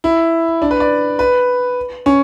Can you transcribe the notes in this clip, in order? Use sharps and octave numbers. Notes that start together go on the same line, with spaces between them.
E4
D4
B4
D5
B4
C#4